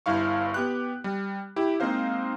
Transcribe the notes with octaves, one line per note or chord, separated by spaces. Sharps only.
G1 G2 E4 F5 C#6
B3 G4 F#6
G3
E4 G4
G#3 A#3 C4 D#4 C5 F5